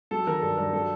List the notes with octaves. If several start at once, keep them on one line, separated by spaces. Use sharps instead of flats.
F#3 A4
D#3 A#4
G2 A4
G2 A#4
F#3 A4